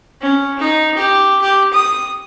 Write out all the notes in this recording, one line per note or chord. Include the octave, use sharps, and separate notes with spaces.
C#4
D#4
G4
G4
D#6